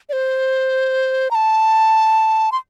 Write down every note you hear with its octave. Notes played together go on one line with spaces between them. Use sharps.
D5
C5
A#5
A5
C6